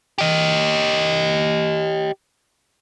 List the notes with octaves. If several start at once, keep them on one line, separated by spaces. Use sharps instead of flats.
G4 D#5